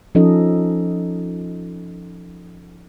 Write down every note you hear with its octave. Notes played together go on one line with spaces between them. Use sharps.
F3 C#4 D#4 A4 D#5